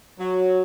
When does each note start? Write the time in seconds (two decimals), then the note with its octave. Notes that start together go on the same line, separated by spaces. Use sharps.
0.19 F#3